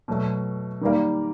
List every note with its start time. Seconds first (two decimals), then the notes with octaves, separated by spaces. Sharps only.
0.08 B2 F#3 A3
0.81 D#3 G3 A#3